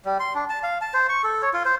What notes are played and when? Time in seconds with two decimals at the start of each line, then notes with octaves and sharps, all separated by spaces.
0.05 G3
0.20 C6
0.35 D4
0.50 A5
0.63 F5
0.81 A5
0.94 C5
1.09 C#6
1.24 A4
1.42 C#5
1.54 F4
1.65 C5